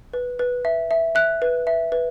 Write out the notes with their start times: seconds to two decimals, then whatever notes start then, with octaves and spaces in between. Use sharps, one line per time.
0.13 B4
0.39 B4
0.65 E5
0.91 E5
1.15 E5 F#6
1.42 B4
1.67 E5
1.92 B4